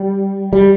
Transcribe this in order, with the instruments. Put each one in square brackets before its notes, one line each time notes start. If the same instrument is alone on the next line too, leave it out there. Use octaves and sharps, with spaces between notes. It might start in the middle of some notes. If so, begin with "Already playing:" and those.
Already playing: [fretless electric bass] G3
G3